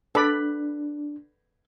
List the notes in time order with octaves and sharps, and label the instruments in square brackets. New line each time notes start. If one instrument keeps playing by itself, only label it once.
[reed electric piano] D4 [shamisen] A4 [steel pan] B4 D5 B5